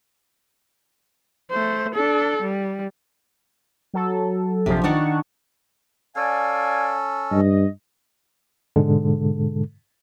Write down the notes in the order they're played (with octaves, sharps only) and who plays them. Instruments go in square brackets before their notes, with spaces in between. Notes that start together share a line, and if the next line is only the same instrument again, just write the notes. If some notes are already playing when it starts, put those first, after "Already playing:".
[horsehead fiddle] A3 C5
D4 A4
G3
[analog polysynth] F#3 A4
[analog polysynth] A#1 F3 [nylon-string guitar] C3
[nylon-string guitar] D#3 D4 D#4 [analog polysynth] F#5 A5 C#6
[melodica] C#4 A4 [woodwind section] D5 F5 G#5
[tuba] G2 [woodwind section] D#5
[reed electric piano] G#2 B2 D3 G#3 A4